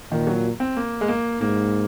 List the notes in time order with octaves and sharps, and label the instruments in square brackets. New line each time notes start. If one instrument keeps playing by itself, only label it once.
[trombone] A#2 [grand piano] D#3
[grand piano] F#3
C4
A#3
G#3
A#3
[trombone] G#2 [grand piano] A#3